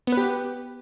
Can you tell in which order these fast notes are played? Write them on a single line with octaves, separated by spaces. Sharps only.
B3 B4 G4